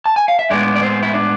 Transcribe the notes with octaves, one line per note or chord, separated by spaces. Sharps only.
A5
G#5
F5
E5
A2 G#3 B3 D4 D5
D5
C4 C5
E4
D4